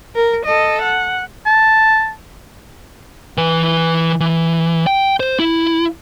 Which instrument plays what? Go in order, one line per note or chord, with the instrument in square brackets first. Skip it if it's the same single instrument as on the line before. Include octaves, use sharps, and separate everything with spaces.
[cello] A#4
A4 D#5
F#5
[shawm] A5
[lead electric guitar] E3 B4
E3
G5
C5
E4